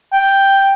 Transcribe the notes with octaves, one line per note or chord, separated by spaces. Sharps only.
G5